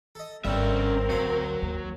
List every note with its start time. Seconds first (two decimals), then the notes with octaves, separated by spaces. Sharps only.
0.15 A4 D#5
0.45 G#1 G2 D3 G3 C4 C#4 A#4 E5
1.10 D2 F#3 F5
1.62 D#2